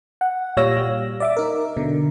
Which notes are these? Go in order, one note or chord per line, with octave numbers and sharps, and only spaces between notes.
F#5
A#2 G3 C#5 F5 E6 A#6
G3
D5 E5 D6
D#4 A#4
B2 D3